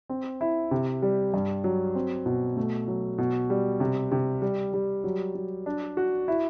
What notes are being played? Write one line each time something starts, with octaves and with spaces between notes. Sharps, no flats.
C4
E4
C3
G3
G2
F#3
C4
B2
A3
F#3
B2
G3
C3
C3
G3
G3
F#3
F#3
D4
F#4
E4